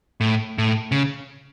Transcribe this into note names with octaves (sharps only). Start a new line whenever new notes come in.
A2
A2
C#3